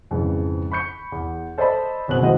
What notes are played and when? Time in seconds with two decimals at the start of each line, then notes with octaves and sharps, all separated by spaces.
0.11 F2 G#2 C#3 E3
0.71 B5 C#6 G6 C#7
1.12 E2
1.58 A4 C5 D5 D#5 A5 B5
2.08 F#1 B2 C4 F#6 F#7
2.22 C#2 A2 D#3 F#4 C5 D#5